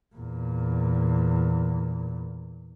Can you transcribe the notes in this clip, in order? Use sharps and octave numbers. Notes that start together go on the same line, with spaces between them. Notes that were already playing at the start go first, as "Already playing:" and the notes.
E2 A#2